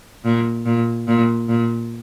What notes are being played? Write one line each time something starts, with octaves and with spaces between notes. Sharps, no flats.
A#2
A#2
A#2
A#2